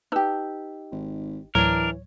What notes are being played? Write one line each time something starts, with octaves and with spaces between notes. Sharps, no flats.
D#4 G4 B4 A5 E6
G#1
D2 A2 E3 F#3 D4 A#4 C#5